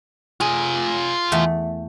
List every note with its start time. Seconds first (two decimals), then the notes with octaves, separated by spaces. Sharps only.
0.40 F4 G#4 G#5
1.32 E2 A3